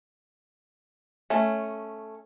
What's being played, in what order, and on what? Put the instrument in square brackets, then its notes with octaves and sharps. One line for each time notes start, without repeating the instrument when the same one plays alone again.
[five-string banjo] A3 C#4